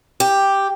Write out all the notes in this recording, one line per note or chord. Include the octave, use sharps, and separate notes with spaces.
G4